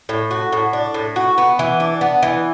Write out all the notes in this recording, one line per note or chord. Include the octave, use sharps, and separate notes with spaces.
A2
F#4
A2
D4
A2
F#4
B3
E3
D4
B3
E3